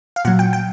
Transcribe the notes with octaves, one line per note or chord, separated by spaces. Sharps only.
F5
A#2 F#3 F#5
G5
G5